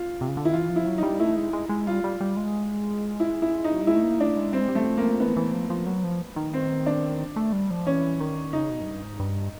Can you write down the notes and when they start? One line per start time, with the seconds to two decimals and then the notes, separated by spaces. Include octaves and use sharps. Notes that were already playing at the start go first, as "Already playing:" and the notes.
Already playing: F4
0.21 C3
0.29 C#3
0.37 D3
0.45 D#3 E4
0.53 E3 F4
0.69 F3
0.76 E4
0.86 F#3
0.98 G3 D#4
1.20 A3 E4
1.36 G#3
1.53 G#3
1.69 G#3
1.87 G3 F4
2.04 G3
2.21 G3
2.37 G#3
3.20 E4
3.42 E4
3.64 D#4
3.74 F#3
3.81 G3
3.87 G#3 E4
3.96 A3
4.03 A#3
4.19 A3 D4
4.36 G#3
4.53 G3 C4
4.61 G#3
4.68 G3
4.75 A3
4.87 F3
4.97 A#3
5.20 E3 B3
5.37 E3
5.53 F3
5.70 F3
5.87 F#3
6.04 F3
6.36 D#3
6.53 C4
6.86 D4
7.36 A3
7.53 G3
7.70 F3
7.86 E3 C#4
8.20 D#3
8.53 C#3 D#4
8.70 B2
8.81 F#2
8.86 G2
9.03 G#2
9.20 G2